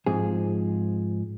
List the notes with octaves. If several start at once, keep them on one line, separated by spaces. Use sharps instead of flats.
G#2 F3 C4 G#4